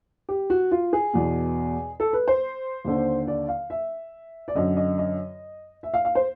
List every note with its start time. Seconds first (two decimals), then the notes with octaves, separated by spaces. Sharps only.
0.29 G4
0.50 F#4
0.71 F4
0.93 G#4
1.14 E2 B2
2.00 A4
2.13 B4
2.28 C5
2.85 D#2 D3
3.27 D5
3.48 F5
3.70 E5
4.48 D5
4.55 F#2 D3 D#5
4.77 D#5
4.98 D#5
5.83 E5
5.94 F5
6.05 F5
6.15 C5